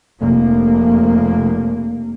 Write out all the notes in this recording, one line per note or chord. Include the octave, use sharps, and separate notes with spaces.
F1 A#3